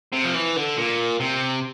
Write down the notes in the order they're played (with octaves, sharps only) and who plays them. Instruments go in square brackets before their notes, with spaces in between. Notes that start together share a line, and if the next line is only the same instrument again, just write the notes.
[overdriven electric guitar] C3
F3
E3
D3
A#2
C3